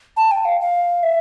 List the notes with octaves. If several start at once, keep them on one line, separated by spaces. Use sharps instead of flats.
A5
G5
F5
F5
E5